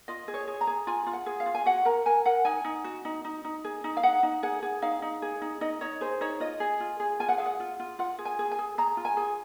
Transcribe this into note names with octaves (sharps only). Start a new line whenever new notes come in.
F4 D#5
G#4
C#5
G#4
A#5
G#4
F4 G#5
F4
F#5
G#4
F5
F4
G#5
F#4 F#5
A#4 A#5
A#4 G#5
A#4 F#5
D#4 G#5
D#4
F#4
D#4
D#4
D#4
G#4
D#4
F5
D#4 F#5
D#4
G#4 F#5
G#4
D#4 F5
D#4
G#4
D#4
D#4 D#5
D#4 C#5
G#4 C5
D#4 C#5
F4 D#5
G#4
F4
G#4
F4 G#5
F#5
G#4 F5
F#5
F4
F4
F4 F#5
G#4
G#5
G#4
G#5
G#4
G#4 A#5
F4
G#5
G#4